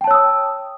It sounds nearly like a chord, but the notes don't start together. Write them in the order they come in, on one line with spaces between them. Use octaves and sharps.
G5 A5 C#5 E6 D#6